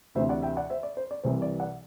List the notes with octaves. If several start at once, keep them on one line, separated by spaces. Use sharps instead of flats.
D2 C3 E3 C5 E5
D5 F#5
E5 G5
D5 F#5
C5 E5
D5
C5
D5
C2 C3 E3 C5
D5
D5 F#5